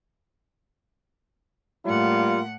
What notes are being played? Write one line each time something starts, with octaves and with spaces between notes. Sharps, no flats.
A2 G3 A#3 F4 F#5